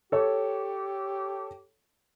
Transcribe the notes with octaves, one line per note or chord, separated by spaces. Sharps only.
G4 A4 C#5